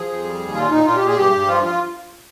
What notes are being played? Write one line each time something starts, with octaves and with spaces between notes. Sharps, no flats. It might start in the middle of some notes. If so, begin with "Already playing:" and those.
Already playing: F3 G#4
F2
G3
D#2
A#2 F4
A#2 D#4
A#2 F4
A#2 G4
G#4
G2 G4
G2
F3 F4
F4